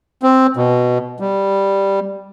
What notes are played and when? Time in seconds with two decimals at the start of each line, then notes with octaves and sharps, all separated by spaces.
0.23 C4
0.57 B2
1.20 G3